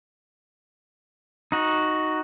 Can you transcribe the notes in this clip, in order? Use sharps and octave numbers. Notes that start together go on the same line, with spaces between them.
D#4 F#4